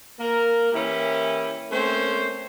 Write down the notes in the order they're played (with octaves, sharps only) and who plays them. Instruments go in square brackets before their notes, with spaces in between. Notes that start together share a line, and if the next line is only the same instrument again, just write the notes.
[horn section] A#3 A#4
E3 A#3 C#4 E4 G4
A3 A#3 C4 C#4 C5